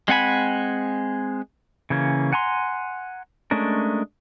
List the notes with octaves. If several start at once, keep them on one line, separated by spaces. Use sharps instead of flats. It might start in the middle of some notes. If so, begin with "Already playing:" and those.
G#3 C4 F#5 G#5 B5
C#3 E3 A#3 C#4
F#5 G#5 A#5 C6
G#3 A3 C#4 D4 A#4